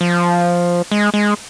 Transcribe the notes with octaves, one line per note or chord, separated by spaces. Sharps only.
F3
G#3
G#3